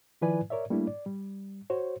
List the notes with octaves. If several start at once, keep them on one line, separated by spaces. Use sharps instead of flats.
D#3 F3 E4 B4 D5 G#5
A#4 C#5 D5 E5
G3 A3 A#3 D4 E4
D5
G3
F#4 C5 C#5